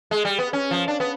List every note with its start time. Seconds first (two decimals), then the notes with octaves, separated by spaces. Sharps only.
0.11 G#3
0.25 G3
0.39 B3
0.53 C#4
0.71 F3
0.88 D4
1.00 B3